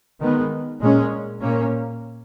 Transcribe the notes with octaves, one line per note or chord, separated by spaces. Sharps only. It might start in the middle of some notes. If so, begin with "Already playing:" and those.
D#3 G#3 B3
A#2 G#3 C#4
A#2 A#3 C#4